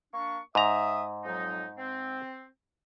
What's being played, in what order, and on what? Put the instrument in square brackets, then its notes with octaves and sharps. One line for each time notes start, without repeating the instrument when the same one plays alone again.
[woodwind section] A#3 D4 C#6
[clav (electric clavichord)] G#2 A#5 [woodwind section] E5 D#6
[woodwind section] F2 F#3 D#4
C4